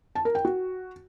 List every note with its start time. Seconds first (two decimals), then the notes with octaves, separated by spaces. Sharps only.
0.15 A5
0.25 A#4
0.35 G5
0.45 F#4